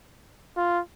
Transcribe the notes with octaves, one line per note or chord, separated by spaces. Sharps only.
F4